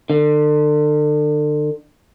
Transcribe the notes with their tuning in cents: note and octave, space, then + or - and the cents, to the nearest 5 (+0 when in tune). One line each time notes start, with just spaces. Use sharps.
D3 +35